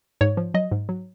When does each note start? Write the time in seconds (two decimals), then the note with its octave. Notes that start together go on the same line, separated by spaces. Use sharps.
0.21 G#2 C#5
0.37 F3
0.54 F#3 D#5
0.72 G#2
0.89 F#3